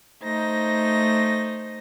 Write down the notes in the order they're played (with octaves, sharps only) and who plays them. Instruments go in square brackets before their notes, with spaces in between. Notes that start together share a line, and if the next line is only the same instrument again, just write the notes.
[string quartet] A3 D#4 C5 A#6